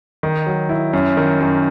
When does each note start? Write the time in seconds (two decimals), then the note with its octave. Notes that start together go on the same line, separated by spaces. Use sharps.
0.23 D#3
0.47 F#3
0.69 E4
0.93 F#2
1.17 D#3
1.40 F#2